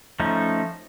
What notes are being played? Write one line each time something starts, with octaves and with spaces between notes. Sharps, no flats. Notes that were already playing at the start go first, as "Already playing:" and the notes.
F3 A3 C#4 D#4